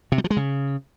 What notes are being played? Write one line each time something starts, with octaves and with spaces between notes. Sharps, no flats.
C3
G3
F3
G#3
C#3